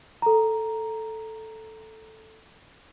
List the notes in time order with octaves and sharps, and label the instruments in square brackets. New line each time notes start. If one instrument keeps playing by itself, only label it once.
[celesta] A4 A#5